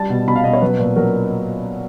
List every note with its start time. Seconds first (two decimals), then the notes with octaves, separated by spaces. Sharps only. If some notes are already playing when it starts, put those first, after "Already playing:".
Already playing: G3 A5
0.10 B2
0.27 B2 B5
0.36 F5
0.44 B2 D#5
0.53 C#5
0.61 F#3 B4
0.79 A#2
0.96 F#3 A#4